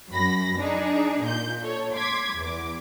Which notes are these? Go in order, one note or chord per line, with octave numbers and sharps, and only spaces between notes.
F#2 B5 A#6
D4 D#4 G#4
A#2 G6
A4 C#5
C6 D6 G#6 B6
E2 D6